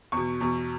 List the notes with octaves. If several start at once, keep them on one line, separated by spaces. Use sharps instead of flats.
E2 B2 C#6
E2 B2